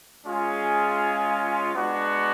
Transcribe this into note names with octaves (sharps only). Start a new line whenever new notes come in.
G#3 C#4 F4 G#4
G#3 B3 D4 F#4